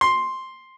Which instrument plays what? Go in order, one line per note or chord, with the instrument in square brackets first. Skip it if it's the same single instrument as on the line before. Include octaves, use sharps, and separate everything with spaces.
[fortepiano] C6